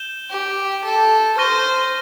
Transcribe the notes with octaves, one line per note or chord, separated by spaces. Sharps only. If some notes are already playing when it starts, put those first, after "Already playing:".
Already playing: G6 E7 G7
G4
A4
C5 C#6 F6 A#6 D#7 G7